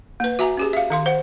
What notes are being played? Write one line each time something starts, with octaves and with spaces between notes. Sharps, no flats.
A#3 B4
F#4 E5 G#5 A#5
C#4 G4 G#4
E5 F5
D#3 F5 C6
C5 F#5